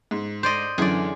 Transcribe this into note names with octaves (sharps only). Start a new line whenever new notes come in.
G#2
C5 D5 D#5
F#2 D3 E3 G#4 D5